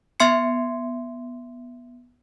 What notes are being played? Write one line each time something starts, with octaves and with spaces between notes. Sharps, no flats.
B3 E5 C6 G#6 C7 C#7